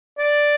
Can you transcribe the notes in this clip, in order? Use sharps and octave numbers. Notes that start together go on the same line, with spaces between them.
D5